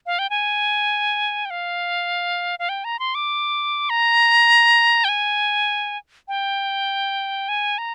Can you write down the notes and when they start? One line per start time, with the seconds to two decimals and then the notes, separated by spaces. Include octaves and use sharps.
0.06 F5
0.19 G5
0.30 G#5
1.45 G5
1.50 F5
2.59 F5
2.69 G5
2.84 A#5
2.99 C6
3.15 D6
3.90 A#5
5.04 G5
5.09 G#5
6.28 G5
7.49 G#5
7.78 A#5